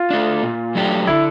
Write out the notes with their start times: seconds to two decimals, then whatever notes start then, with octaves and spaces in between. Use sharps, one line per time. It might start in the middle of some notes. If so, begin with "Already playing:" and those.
Already playing: F4
0.10 A3 D4
0.43 A#2
0.75 F#3 A3 D4 G4
1.07 D3 E4